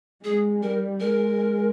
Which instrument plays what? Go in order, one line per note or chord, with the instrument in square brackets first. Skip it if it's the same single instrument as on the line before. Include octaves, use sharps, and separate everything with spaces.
[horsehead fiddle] G#3 [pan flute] G#4
[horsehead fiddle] G3 [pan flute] A#4
[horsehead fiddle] G#3 [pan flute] A#4